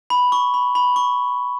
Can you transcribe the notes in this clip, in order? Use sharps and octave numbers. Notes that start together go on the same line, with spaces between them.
B5
C#6
B5
B5
C#6